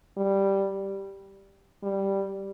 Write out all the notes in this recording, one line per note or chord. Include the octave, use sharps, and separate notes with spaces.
G3
G3